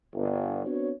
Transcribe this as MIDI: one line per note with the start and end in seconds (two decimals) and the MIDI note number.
0.14 0.66 31
0.66 0.90 59
0.66 0.90 60
0.66 0.90 62
0.66 0.90 66
0.66 0.90 73